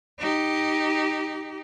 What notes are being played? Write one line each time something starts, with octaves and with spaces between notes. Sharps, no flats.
D#4 G4